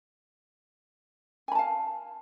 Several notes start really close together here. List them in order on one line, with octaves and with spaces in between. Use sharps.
G#5 B5 A5 F5